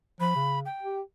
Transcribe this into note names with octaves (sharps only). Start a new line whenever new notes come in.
F3 B5
C#3
G5
G4